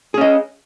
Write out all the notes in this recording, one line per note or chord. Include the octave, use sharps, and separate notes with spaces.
C#4 G#4 D#5